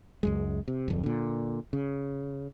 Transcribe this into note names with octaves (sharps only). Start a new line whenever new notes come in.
C#2 F#2 G#3
C3
D1 F2
A#2 D3
C#3